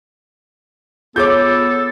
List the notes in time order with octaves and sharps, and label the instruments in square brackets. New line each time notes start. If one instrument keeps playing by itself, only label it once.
[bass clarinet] B3 [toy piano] F4 G#4 C#5 [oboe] A4 [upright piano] D6 G6